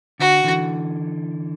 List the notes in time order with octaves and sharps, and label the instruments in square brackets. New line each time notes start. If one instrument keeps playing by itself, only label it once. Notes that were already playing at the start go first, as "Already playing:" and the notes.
[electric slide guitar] D3 [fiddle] F#4
[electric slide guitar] D3 E3